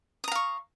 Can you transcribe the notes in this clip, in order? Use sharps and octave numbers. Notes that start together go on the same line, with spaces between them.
F5 A#5 C#6 D#6